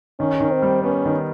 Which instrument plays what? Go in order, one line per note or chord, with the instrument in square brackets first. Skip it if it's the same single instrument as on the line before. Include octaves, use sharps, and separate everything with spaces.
[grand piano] D#3 [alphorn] C#4
[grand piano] D#3
[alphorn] C4
[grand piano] G3
[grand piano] B3 [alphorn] C#4
[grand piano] D#3